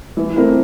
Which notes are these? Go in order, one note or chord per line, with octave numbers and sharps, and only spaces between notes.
E3
A3 C4 E4 A#4